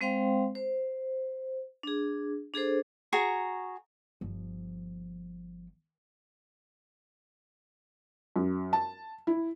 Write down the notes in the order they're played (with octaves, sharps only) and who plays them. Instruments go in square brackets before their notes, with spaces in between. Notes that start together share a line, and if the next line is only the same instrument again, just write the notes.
[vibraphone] G#3 C4 C5 F5 G5 C6
C5
D4 G#4
D4 G#4 A4 C5
[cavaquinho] F#4 G#4 A#5 C#6
[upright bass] G1 F3
[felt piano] F#2
A5
E4